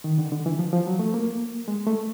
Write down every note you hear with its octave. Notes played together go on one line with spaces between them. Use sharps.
D#3
D3
D3
E3
F3
F3
F#3
A3
A#3
G#3
A3